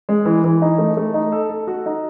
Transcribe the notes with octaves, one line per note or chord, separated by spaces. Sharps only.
G#3
E3
E3
D#4
A3
A3
D#4
A4
A4
F#4
D#4